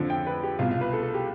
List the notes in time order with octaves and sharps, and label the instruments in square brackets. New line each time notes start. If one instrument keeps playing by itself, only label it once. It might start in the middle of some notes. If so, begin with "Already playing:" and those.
Already playing: [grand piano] F2 D3 F3
G5
B4
G4
C2 B2 F4
F4
B4
A4
A4
G4